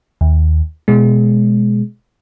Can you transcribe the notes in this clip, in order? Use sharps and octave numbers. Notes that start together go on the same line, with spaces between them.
D#2
B2 G#3